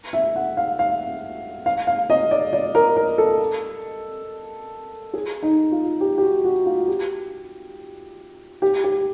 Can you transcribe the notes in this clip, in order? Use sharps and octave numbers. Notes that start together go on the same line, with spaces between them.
E5
F#5
F5
F5
F5
F5
D#5
D5
D5
A#4
A#4
A4
G#4
D#4
F4
G4
G4
F#4
F#4
F4
G4
G4
G4